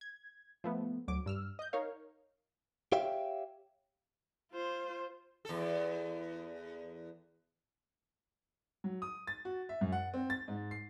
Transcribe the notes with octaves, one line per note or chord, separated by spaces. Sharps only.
G#6
F3 A3 B3
D2 F#3 D6
G2 E6 F6
D#5 G6
D#4 A#4 C#5 F5
G4 C#5 E5 F5 G5
F4 C5
E2 A4
F#3
D#6
A6
F#4
E5
F#2
F#5
C4
A6
G#2
C7